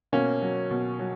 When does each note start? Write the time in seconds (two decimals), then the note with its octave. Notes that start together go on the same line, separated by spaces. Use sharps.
0.12 B2 A#3 C#4
0.41 F#3
0.71 B2
0.99 F#3